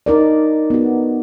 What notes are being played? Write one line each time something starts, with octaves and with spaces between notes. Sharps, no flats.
D#4 A#4 D5
B3 F#4